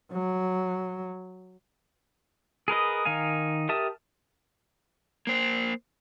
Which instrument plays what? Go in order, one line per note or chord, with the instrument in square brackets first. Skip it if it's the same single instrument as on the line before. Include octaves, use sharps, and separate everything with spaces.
[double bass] F#3
[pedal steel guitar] G#4 A#4 B4 D#5
D#3 D#4 F5 G#5
G4 A#4 E5 A5 D#6
[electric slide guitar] A#3 C5